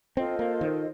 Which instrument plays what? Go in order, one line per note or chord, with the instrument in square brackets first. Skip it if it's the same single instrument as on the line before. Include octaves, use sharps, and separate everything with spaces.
[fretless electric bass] C4 [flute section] F4 A4 C5 D#5
[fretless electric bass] A#3
D#3